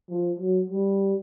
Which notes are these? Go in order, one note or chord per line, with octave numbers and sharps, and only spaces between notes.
F3
F#3
G3